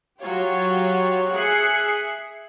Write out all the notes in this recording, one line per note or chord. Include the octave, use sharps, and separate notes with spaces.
F#3 F4 G4 C#5
G#4 E5 F#6 C7 C#7